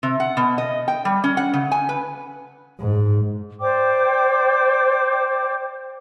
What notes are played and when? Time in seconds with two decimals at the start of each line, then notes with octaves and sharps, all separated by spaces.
0.03 C3
0.20 F#5
0.37 B2
0.58 D#5
0.88 G5
1.05 G3
1.24 C#4
1.37 F#5
1.54 C#3
1.72 G#5
1.89 B4
2.79 G#2
3.61 C5 D5 G5 D6